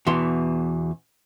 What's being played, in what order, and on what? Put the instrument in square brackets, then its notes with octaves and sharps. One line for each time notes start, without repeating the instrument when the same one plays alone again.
[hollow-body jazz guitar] E2 B2 E3 C6